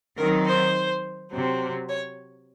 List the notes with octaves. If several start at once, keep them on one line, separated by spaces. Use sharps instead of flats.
D#3 F#3 C4 D#4 A#4
C5
C3 F#3 C4
C#5